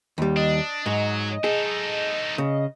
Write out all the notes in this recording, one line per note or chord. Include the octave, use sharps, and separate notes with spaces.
D#2 G3
D4 D#5
G#2 F#3
D#4 G#4 A4
C#3